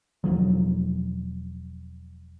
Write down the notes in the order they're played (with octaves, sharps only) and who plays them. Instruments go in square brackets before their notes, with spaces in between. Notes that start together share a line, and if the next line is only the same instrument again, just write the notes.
[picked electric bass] E1 D2 F3 F#3